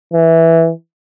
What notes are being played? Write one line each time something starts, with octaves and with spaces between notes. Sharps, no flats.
E3